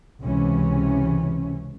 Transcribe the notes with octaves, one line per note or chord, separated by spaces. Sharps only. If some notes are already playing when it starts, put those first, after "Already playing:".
C#2 C3 E3 C#4